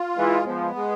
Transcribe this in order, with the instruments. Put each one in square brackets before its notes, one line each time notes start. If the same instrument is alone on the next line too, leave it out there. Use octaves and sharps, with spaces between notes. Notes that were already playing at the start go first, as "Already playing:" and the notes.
Already playing: [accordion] F4
[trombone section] E3 [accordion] G#3
[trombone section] F3 [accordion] B3
[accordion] G#3